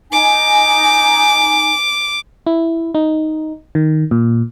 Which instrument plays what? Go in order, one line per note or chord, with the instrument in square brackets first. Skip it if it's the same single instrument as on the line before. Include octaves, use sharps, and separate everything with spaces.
[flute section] D#4 G#5 [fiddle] D6
[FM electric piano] E4
D#4
D#3
A#2